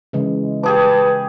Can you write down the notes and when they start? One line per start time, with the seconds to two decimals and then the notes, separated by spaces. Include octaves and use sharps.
0.13 C#3 E3 G#3
0.63 G4 G#4 B4 A5 D6